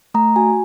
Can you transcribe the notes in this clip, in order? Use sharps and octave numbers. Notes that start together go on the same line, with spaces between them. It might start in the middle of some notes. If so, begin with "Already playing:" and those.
A3 A#5
F#4 G#5